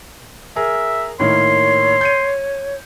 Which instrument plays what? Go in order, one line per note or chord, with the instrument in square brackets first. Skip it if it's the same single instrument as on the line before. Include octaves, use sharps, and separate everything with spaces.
[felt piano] G#4 A#4 [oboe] E5
[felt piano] A2 D#3 A#3 [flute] C#5 [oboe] C6
[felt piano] G6 C#7 D#7